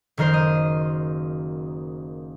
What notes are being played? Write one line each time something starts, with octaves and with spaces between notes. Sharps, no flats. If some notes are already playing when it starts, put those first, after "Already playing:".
F#1 D#3 A#4 C5
D#5